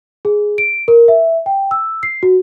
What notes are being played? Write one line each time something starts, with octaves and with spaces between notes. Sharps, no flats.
G#4
D7
A#4
E5
G5
E6
C7
F#4